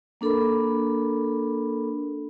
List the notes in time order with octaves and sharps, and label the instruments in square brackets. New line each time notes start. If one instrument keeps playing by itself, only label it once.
[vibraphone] A#3 D4 A4 A#4 B5